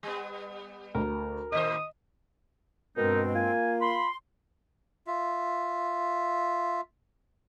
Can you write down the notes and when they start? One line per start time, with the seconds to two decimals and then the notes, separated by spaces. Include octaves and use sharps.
0.03 G3 B3
0.95 D2 A#4
1.52 A2 D#3 C5 D#5 D#6
2.97 G2 B2 G#3 C4 D#4 A#4
3.35 A#3 F4 G#5
3.81 B5 C6
5.07 F4 E5